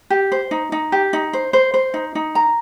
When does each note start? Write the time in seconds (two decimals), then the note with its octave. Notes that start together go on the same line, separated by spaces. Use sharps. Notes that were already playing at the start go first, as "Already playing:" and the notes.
0.10 G4
0.32 C5
0.51 D#4
0.72 D#4
0.92 G4
1.13 D#4
1.33 C5
1.53 C5
1.74 C5
1.94 D#4
2.15 D#4
2.35 A#5